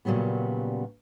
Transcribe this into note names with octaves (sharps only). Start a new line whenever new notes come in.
A#2 C#3 F#3 G3 B3